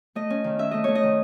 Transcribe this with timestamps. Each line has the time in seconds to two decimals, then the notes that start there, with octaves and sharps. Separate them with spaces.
0.15 A3 D#5
0.30 C#4
0.44 D#3
0.59 C#4 E5
0.71 A3 D#5
0.84 A3 C#5
0.95 D#5
1.03 D#3